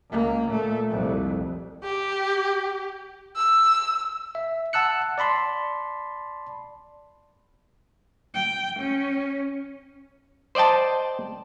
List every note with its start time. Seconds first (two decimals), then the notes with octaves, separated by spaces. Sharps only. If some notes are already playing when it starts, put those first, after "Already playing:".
0.10 C#2 A#3
0.47 A#2 A3
0.88 C2 F2
1.84 G4
3.37 E6
4.35 E5
4.73 F#5 A5 E6 F#6 C#7
5.18 D5 A5 B5 C6
8.34 G5
8.80 C#4
10.55 C5 D5 D#5 G5 A5